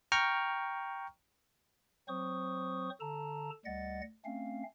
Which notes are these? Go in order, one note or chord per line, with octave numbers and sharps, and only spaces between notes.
G5 A#5 C#6 F6
F#3 C4 C5 C#6 D#6
D3 A4 A5 A#5
D2 G3 D#5 F#5 A6
A3 C4 C#4 F5